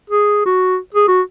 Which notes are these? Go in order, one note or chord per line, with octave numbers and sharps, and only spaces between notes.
G#4
F#4
G#4
F#4